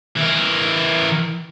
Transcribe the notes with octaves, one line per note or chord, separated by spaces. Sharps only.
E3 A#4